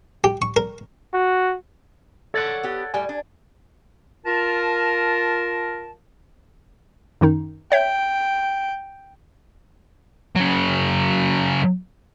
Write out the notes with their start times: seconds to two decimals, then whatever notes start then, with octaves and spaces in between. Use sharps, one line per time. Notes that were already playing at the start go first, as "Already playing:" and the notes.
0.24 G4
0.42 C#6
0.56 A#4
1.13 F#4
2.34 A4 C#5 D5 F#5
2.63 B3 G4
2.94 A2 G3 G5 G#5
3.09 D4
4.26 F4 A#4 A5
7.21 F#2 D#3 D#4
7.72 C#5 E5 G5 G6
10.35 C#3 F#3